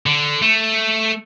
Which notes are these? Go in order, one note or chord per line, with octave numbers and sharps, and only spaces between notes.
D3
A3